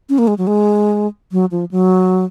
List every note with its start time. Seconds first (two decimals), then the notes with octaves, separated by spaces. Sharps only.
0.09 C#4
0.18 A#3
0.27 G#3
0.38 F#3
0.47 G#3
1.32 F#3
1.51 F3
1.71 F#3